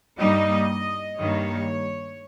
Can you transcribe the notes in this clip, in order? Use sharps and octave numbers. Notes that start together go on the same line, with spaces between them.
G2 G3 A#3 D#4 D#5
G2 D#3 G3 A#3 C#5